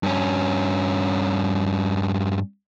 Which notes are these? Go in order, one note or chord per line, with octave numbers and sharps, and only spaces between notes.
G2 C#4